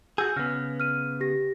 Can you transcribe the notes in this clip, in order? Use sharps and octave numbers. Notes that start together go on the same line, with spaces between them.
F#4 G#4 E6 G6
C#3 B3 F6 A#6
F6 D#7
G4 A#6